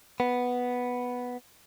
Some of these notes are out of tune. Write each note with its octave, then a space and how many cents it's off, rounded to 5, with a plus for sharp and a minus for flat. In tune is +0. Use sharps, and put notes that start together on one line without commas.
B3 +0